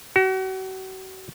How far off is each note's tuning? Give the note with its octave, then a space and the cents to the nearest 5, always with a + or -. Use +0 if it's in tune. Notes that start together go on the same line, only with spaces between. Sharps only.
F#4 +40